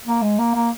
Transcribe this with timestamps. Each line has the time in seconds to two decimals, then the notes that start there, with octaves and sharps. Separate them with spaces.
0.07 A#3
0.22 G#3
0.39 A#3
0.55 A#3